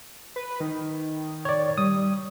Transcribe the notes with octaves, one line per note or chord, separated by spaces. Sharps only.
B4
D#3
C#5 D5
G3 D#6